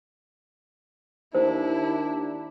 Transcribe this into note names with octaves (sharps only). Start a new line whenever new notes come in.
D#2 D4 E4 C5